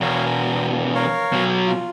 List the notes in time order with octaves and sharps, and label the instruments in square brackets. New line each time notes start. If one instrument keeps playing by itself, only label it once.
[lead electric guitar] E2 B2 [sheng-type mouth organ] A#4 C#5 F5
[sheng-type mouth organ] A#4
A#4 C#5 F5
[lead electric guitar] B2 F#3
[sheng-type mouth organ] F4